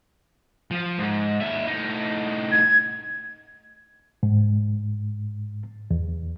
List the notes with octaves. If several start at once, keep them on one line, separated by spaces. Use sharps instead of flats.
F3
G#2
D#2 E5
A2 D#4
G#6
G#2
E2